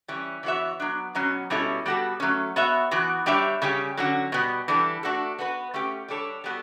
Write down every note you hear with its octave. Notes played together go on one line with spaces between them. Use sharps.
E3 G3 C#4
E3 B3 F#4 C#5 E5
F#3 B3 D4
B2 F#3 C#4
B2 G3 C#4 E4 A4
G3 B3 F#4 A4
F#3 A3 C#4
B3 F#4 C#5 E5
E3 B3 F#4
G3 D4 G4 C#5 E5
C#3 G3 C#4 G4
D3 F#3 C#4 F#4
B2 G3 B3
E3 G3 D4 A4
A3 D4 F#4 A4
B3 F#4 B4
A3 C#4 G4
G3 D4 A4 C#5
G3 B3 F#4 A4